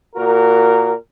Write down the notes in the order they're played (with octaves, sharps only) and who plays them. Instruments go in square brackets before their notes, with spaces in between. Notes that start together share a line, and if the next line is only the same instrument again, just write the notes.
[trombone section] A#2 F#4 A#4